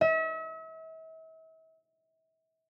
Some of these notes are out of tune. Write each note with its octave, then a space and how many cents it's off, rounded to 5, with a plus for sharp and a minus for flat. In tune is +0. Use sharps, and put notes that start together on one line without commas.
E5 -40